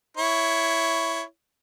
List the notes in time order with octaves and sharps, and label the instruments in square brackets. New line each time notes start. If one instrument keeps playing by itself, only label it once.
[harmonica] E4 C#5